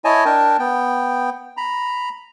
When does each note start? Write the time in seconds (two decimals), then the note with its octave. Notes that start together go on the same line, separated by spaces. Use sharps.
0.05 E4 C#5 D#5 G#5 A5
0.25 D4 A#4 G5 A5
0.59 B3 G5
1.57 A#5 B5